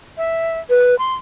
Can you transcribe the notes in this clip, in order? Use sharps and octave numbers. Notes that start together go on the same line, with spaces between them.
E5
B4
C6